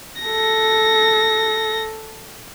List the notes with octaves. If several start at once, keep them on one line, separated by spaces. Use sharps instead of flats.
A4 A#6